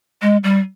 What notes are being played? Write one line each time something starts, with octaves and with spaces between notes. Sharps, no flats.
G#3
G3